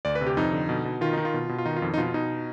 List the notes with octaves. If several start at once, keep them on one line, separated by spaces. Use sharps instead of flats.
D2 D5
B4
C3
G4
F2 D#4
D3
B2
B2
D#3 F4
D#3 D#4
F4
B2
B2
F4
D#3 D#4
F4
F2
D#4
B2 F4
B2 D#4